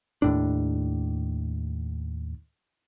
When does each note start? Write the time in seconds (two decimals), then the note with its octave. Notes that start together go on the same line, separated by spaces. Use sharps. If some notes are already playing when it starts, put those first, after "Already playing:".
0.22 D#2 A2 D4